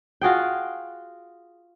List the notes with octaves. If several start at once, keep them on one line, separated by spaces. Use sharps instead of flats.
F4 F#4 G#4 G5